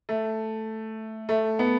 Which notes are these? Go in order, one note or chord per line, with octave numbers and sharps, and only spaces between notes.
A3
A3
B3